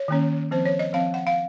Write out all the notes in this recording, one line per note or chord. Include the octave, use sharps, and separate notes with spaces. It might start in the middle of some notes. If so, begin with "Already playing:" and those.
Already playing: C#5
D#3 A#3 C#4
F3 C4 C5
C#5
D#5
F3 C4 F5
F#5
F5